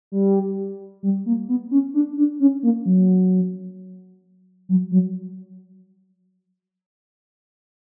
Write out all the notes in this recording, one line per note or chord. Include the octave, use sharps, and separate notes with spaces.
G3
G3
A#3
B3
C#4
D4
D4
C#4
A#3
F#3
F#3
F#3